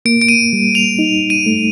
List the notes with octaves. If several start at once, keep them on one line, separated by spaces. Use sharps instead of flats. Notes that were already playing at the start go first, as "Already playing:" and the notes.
A#3 D7
D7
D#7
G3
F7
D#4
D#7
A3